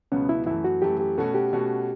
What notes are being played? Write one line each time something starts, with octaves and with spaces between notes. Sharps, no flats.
C#2 B2 F#3 B3 C#4
E4
F#2 E3 A3 E4
F#4
F#2 E3 A3 G4
G4
B2 A3 C#4 F#4 A4
G4
B2 A3 C#4 F#4